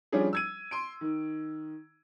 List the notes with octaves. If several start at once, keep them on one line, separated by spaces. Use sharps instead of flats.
F3 G3 C#4 D4 G#4
E6 G#6 D#7
C6 D7
D#3